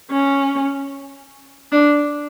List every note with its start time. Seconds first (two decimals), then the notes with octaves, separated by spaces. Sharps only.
0.11 C#4
1.72 D4